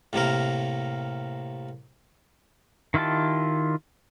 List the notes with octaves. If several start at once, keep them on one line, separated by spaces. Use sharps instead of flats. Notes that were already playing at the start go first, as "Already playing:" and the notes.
A2 C3 A#3 A#4
D#3 E4 F4 G4 A5